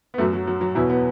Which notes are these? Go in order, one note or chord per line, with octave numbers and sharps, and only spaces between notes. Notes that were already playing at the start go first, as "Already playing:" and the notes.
B3
F#2 F#3 A3
F#3
F#3
F#3
E2 B2 F#3 E4
B3